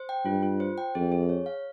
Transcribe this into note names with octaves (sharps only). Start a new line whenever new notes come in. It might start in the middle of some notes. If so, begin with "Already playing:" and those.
Already playing: C5
G5
G2 F4
F4
C5
G5
F2 G#4
G#4
C#5
F5